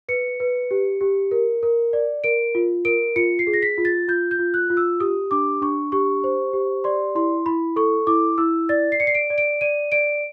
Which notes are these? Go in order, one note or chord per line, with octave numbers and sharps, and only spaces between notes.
B4 C#7
B4
G4
G4
A#4
A#4
D5
A#4 D7
F4
A#4 D7
F4 C#7
C7
G#4
A#6
B6
F4
A6
F4 G6
G6
F4
F#6
F4
E6
G4 D#6
D4 D6
D4 C#6
G4 C#6
C5
G4
D5 C6
E4 C6
E4 B5
A4 C#6
E4 D6
E4 E6
D5 A6
C7
D5 C#7
C7
D7
D5
D7
D5 D#7
D5 D7